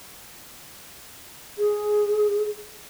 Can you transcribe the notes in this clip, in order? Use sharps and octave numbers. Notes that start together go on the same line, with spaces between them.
G#4